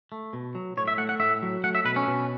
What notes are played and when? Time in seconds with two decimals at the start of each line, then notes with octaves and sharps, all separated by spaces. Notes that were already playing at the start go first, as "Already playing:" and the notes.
0.12 A3
0.33 B2
0.55 F#3
0.77 A2 C#5
0.88 E5
0.98 A3 F#5
1.09 F#5
1.20 A2 E5
1.42 F#3
1.64 A3 F#5
1.75 E5
1.85 B2 B4
1.96 C#4
2.08 B2